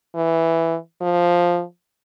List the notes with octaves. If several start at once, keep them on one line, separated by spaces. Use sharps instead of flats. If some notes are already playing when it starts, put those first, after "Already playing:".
E3
F3